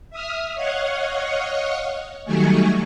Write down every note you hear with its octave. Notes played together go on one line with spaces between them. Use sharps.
E5 D#6 F6
C#5 D#5 F5 F#5 C#6
D#3 F#3 G3 A3 G#5 C#6